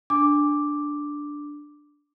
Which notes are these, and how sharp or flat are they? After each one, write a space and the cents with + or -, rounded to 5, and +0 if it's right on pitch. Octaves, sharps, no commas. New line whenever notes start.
D4 +0 D6 +0